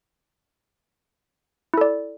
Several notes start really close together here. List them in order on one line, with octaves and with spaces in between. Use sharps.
E4 A4 D5